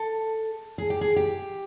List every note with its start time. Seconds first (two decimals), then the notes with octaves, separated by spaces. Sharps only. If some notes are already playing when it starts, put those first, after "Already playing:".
Already playing: A4
0.78 G#4
0.90 G4
1.01 G#4
1.16 G4